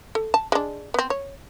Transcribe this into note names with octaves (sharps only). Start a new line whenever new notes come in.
A4
A5
G#3 D4
B3 C4
C#5